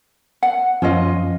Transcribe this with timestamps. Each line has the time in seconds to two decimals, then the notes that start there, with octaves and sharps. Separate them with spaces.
0.43 F#5
0.82 F#2 F3 C#4 F4 D#5